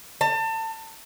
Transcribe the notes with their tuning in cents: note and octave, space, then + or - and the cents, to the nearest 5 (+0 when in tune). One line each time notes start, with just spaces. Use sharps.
A5 +30